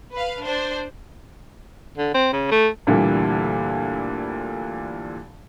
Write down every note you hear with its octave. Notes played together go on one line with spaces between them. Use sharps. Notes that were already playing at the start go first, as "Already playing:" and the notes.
B4 F5
D4 C5
D3
C4
C#3
A3
D2 A#2 D3 E3 G3